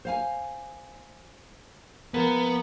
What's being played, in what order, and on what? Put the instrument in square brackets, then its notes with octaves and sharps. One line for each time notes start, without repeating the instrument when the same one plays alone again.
[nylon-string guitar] C5 F5 G#5
[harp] F3 G#3 A#3 [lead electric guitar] B3